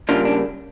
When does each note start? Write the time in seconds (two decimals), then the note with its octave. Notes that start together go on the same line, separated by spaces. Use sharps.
0.09 C#3 G3 A#3 D4 F4
0.25 D4